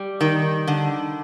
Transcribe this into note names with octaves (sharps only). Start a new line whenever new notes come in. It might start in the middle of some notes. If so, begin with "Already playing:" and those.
Already playing: G3
D#3
D3